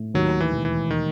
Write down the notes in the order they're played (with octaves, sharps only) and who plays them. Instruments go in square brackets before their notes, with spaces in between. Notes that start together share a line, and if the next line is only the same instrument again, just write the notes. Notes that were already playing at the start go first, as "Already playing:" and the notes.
Already playing: [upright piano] A2
[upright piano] D#2 [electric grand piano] F#3
[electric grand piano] E3
[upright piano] E1
[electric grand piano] E3
D#3